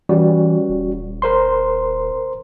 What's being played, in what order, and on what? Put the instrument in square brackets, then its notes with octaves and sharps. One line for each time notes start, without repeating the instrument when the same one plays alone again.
[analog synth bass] E3 [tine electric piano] G3 C#4 F#4
[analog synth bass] D#1
[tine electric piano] A#4 C5 C6